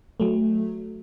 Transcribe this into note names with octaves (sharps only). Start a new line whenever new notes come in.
F#3 A3